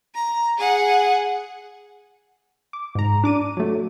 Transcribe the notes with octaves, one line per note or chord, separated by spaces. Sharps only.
A#5
G#4 F#5
D6
G#2 A#5
D4 D6 D#7
F#3 A3